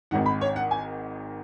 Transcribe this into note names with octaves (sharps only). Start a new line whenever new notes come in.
G#1 G#2 D#3 F#5
B5
C#5
F#5
G#5